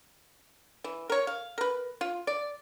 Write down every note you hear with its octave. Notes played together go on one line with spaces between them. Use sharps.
E3
A#4 C#5
F5
A#4 B4
F4
D5